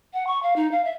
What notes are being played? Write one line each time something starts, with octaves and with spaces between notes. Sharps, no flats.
F#5
C#6
F5
D#4
F5
E5